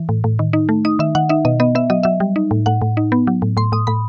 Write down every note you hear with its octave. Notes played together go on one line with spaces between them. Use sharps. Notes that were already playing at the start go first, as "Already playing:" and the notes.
Already playing: E3
A2
A2
D#3
D#4
A3
D#4 D#6
D#3 E5
D#3 F#5
D#4 E5
B2 D#5
B3 D#5
B3 E5
F#3 D#5
F#3 E5
G3
D#4
A2
A2 F#5
A2
D#4
B3
F#3
A2
A2 C6
A2 D#6
A2 B5